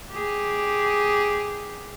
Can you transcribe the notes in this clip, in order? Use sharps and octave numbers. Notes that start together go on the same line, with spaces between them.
G4 G#4